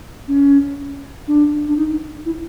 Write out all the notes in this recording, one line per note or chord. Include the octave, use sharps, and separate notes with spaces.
C#4
D4
D4
D#4
E4